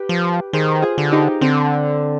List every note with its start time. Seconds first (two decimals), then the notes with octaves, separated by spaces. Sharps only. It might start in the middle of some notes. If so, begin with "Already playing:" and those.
Already playing: G4 B4
0.09 F3
0.53 D#3 G#4 C5
0.82 F4 G#4
0.98 D3
1.12 D#4 G4
1.41 D3 C4